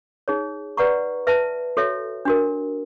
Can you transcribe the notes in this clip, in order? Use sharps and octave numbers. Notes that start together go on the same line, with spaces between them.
D#4 G#4 C#5
B4 D5 F#5 A#5 C#6
B4 E5 A5
F#4 A4 C#5 E5
D4 F#4 A#4